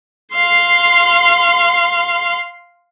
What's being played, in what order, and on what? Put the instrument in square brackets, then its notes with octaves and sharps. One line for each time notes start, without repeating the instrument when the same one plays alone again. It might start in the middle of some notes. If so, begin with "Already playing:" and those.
[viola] F5 C6